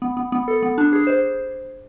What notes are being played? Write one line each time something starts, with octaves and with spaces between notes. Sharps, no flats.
B3
B3
B3
A4
B3
D4
G#4
C5